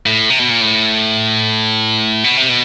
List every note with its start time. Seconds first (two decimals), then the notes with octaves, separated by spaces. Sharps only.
0.06 A2
0.30 C3
0.40 B2
0.50 A#2
0.61 A2
2.24 B2
2.37 C3
2.49 B2